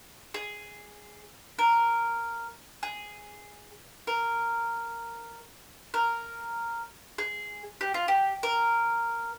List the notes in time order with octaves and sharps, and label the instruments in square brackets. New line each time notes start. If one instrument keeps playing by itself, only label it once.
[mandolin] G#4
A#4
G#4
A#4
A#4
G#4
G4
F4
G4
A#4